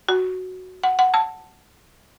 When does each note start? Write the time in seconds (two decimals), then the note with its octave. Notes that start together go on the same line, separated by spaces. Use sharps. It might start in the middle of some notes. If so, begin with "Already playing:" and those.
0.09 F#4
0.84 F#5
0.99 F#5
1.14 A5